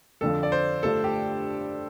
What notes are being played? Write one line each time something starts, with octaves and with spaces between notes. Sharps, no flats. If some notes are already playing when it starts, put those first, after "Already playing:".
F2 D3 F3 A4
D5
C5
G2 D3 A3 D4 F4 A4
G4